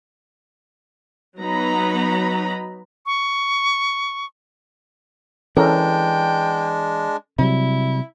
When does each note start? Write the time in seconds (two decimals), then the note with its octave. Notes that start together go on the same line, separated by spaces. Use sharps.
1.39 F#3 B3 D#4 A#5 B5
3.06 C#6
5.57 E3 G#3 C#4 D4 A4 A#4 G5
7.39 C3 F#3 G3 E4